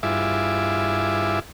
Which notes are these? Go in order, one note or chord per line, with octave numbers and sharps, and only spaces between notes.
G2 E4 F4 G#4 E5 D6